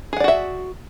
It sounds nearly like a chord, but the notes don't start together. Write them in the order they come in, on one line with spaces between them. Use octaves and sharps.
G#4 F#5 D5 F#4 E5